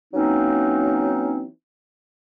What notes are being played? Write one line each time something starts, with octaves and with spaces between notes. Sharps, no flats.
E3 F#3 A#3 C4 C#4 D#4